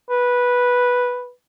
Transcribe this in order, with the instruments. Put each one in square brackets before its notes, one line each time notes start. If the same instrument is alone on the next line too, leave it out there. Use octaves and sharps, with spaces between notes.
[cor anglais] B4